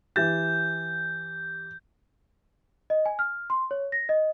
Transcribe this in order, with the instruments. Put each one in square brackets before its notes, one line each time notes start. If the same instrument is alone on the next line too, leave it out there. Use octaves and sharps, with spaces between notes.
[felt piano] E3 G4 A6 [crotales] G6
[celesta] D#5
G#5
F6
C6
C#5
A#6
D#5